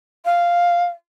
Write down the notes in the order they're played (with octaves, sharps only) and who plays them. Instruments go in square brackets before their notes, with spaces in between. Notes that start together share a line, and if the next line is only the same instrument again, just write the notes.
[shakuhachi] F5